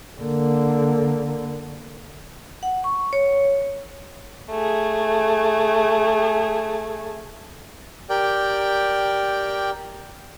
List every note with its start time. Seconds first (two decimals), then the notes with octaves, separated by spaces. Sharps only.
0.20 D3 A#3
2.63 F#5
2.84 C#6
3.13 C#5
4.50 A3 G#4
8.10 G4 A#4 D5 G5